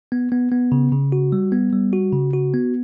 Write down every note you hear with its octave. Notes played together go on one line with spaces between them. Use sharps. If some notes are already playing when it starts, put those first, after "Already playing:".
B3
B3
B3
C#3
C#3
F#4
G3
B3
G3
F#4
C#3
F#4
B3